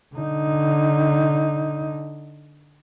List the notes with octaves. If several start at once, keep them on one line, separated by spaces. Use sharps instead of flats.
D3 D#4